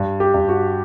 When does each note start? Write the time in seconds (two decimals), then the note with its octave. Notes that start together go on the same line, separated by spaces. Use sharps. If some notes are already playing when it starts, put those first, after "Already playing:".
Already playing: G2
0.20 G4
0.34 G2
0.49 F#4